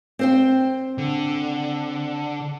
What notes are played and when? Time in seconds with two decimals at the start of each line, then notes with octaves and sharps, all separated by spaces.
0.19 C4 C5 G5
0.98 D3